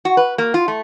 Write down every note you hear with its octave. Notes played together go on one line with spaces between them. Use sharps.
F#4
B4
A#3
F4
A3